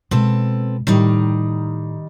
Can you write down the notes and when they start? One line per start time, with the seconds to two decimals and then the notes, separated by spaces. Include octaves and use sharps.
0.11 B2 G#3 C4 A4 B4
0.87 A2 D#3 G3 D#4